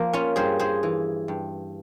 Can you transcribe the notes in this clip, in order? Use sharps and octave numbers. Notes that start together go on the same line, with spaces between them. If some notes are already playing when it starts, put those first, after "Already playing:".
Already playing: F3 A#3
C#4 F4
G2 G#4 C5
G#4 C5
E3
G2